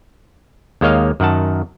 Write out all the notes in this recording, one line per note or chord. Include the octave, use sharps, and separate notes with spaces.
D#2 G#3 A#3 C#5 D#5 F5
F#2 D#3 F#5 A5